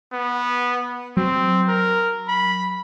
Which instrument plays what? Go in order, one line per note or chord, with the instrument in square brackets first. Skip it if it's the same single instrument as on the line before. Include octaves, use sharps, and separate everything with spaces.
[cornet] B3
[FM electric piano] F#3 [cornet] C4
[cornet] A#4
B5